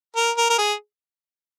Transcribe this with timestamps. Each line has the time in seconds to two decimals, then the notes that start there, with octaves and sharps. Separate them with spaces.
0.16 A#4
0.37 A#4
0.50 A#4
0.58 G#4